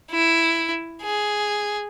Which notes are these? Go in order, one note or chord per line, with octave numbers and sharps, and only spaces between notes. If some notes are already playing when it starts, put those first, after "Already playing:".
E4
G#4